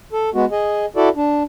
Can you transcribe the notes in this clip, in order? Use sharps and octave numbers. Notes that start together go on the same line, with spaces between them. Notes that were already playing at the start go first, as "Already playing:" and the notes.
A4
G#3 B3 F#4
G#4 D#5
E4 F#4 A4 D5
D4